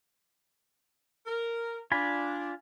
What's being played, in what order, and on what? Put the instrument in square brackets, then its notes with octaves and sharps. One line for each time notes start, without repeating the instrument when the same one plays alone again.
[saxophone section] A#4
[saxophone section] D4 [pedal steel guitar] F4 G#5 B5